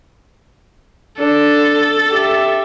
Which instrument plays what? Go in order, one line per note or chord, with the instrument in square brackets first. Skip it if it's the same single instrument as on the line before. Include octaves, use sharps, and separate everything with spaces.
[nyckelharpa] D4 [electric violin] A4
[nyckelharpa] G4 E5